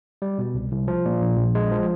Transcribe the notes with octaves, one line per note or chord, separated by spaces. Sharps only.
G3
B2
C2
C2
F3
A#2
A#1
A#1
G#3
F3